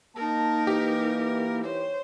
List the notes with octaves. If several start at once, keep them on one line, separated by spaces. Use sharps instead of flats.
A#3 D#4 A#4 A5
E3 G4
C5 C#5